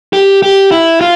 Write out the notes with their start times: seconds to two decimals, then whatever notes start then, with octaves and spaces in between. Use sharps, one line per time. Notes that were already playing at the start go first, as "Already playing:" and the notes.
0.13 G4
0.43 G4
0.72 E4
1.01 F4